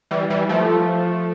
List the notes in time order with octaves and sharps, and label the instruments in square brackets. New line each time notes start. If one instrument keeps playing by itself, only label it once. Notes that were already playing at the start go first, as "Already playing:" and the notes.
[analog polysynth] E3 G3
E3 G3
F3 A3